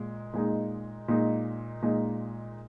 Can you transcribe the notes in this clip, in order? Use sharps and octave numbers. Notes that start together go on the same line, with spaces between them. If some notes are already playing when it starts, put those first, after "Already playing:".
Already playing: A#2 G#3
A#2 G#3 D#4
A#2 G#3 D#4
A#2 G#3 D#4